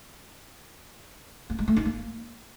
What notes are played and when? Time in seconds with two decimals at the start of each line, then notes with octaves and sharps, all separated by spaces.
1.50 A#3
1.59 G#3
1.68 A3
1.77 D#4
1.85 A#3